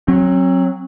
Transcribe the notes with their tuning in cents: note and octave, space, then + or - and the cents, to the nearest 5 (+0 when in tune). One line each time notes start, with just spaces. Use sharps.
F#3 +0 C4 +35